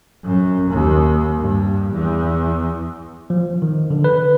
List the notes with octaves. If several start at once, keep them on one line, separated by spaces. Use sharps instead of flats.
F#2
D#2
G2
E2
F3
D#3
D3
B4